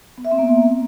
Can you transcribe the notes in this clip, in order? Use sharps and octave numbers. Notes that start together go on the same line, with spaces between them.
B3
E5
C4
A#3
E5